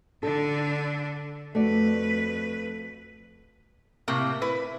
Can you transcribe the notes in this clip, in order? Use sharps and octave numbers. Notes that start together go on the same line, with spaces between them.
D3 D4 A4
F2 A3 F#4 B4 D5
A2 C3 A#3
E4 B4